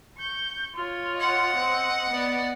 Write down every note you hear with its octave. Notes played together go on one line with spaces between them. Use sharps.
C#6 G6
F4 C#5
D#5 F#5
C4
B3 D5